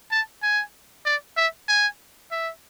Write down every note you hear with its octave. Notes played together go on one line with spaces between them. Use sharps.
A5
G#5
D5
E5
G#5
E5